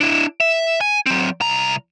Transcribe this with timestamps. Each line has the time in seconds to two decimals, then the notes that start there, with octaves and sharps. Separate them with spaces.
0.01 D4 E4
0.41 E5
0.81 G#5
1.06 F#3 C4
1.41 C2 A#5